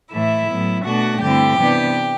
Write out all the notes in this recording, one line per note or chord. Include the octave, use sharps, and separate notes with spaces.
A2 E3 A3 E4 E5
A2 F#3 B3
B2 A3 D4 F#4 F#5
G2 D3 A3 C4 E4 G4 G5
C3 E3 B3 D4